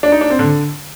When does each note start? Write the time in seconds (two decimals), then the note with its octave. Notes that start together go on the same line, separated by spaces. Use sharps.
0.03 D4
0.12 D#4
0.21 D4
0.30 C4
0.39 D3